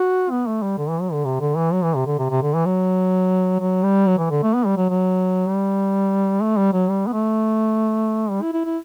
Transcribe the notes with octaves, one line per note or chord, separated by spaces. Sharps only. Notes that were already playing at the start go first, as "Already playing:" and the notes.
Already playing: F#4
B3
A3
G3
D3
E3
F#3
D3
C3
D3
E3
F#3
E3
C3
D3
C3
C3
D3
E3
F#3
F#3
G3
F#3
E3
D3
A3
B3
G3
F#3
F#3
G3
A3
G3
F#3
G3
B3
A3
G3
E4
E4
E4